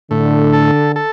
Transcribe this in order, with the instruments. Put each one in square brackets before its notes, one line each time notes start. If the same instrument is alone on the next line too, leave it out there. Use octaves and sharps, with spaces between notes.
[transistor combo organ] A2 [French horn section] D3
[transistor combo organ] A4
A4